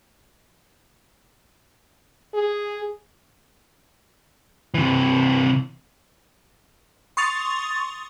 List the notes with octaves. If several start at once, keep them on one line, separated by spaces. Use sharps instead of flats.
G#4
C3 E3
C6 C#6 D#6 A6 F7